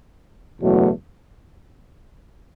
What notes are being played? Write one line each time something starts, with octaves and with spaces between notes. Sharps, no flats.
F#1 E2 B2 F#3 A3